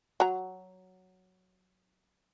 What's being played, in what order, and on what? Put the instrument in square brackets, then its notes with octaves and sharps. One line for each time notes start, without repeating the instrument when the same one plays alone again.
[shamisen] F#3 A#5